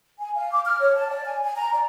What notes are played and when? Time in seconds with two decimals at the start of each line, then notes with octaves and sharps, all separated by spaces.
0.20 G#5
0.35 F5
0.52 D6
0.65 F6
0.80 C#5
0.96 A5
1.10 D5
1.25 G#5
1.43 G#5
1.55 A#5
1.74 D5